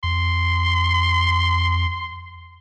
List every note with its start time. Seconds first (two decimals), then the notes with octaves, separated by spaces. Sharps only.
0.04 F2 C6